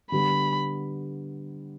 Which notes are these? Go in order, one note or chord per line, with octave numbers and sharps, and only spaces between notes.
D3 G3 B3 B5